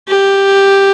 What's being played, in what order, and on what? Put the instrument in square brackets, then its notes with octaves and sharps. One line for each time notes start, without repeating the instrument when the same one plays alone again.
[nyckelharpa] G4